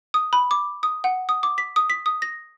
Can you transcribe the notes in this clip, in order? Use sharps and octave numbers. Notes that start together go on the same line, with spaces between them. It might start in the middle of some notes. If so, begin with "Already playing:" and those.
D#6
B5
D6
D#6
F#5
D#6
D6
B6
D#6
B6
D#6
A#6